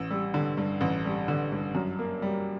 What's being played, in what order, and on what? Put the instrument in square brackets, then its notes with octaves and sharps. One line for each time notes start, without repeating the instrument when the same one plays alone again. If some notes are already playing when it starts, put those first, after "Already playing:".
Already playing: [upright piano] A1 E6
G3
D3
G2
A1
G3
D3
G2
F#2
A#3
G3